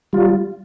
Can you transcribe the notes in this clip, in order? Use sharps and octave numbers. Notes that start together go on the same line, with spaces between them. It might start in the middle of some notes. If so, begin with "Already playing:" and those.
G3 F4